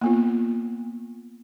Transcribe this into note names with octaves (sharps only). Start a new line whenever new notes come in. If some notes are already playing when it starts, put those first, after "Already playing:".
A#3 B3 F4